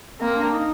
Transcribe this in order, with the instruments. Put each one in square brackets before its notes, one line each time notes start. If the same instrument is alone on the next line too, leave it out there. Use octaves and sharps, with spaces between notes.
[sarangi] A#3 [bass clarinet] C4
[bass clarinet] D4
D#4